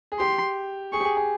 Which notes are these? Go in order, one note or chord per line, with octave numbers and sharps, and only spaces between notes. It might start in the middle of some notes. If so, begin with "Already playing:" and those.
G#4
G4 C6
G#4 C#6
G4
G#4
G#4